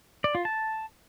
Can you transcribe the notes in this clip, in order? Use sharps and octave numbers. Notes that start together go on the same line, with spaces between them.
D5
F4
A5